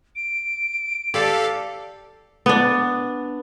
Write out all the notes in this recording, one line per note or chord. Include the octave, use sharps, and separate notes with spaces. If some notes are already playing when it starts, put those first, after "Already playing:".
D7
G4 A4 D5 F5 A5
B3 D4